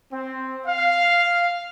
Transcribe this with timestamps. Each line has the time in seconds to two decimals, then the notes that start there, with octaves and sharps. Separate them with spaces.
0.11 C4
0.66 F5